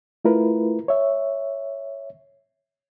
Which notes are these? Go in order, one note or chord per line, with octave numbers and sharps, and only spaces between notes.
A3 E4 F4 A#4 B4
C#5 E5